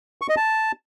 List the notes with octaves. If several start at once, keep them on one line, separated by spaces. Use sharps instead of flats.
C#6
D#5
A5